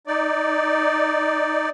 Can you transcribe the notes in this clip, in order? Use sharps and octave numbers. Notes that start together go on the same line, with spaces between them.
D#4 D5